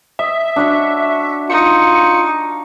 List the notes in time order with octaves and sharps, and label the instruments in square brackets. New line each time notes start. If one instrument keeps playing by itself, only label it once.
[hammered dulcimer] D#5 [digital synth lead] E5
[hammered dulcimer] D4 F#4 C#5
[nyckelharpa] D#4 [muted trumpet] F4 [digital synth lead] C#7